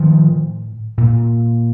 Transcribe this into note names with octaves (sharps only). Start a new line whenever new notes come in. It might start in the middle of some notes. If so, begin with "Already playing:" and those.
Already playing: A2 D#3 F3
A#2